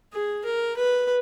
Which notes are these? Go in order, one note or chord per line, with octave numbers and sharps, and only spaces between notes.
G#4
A#4
B4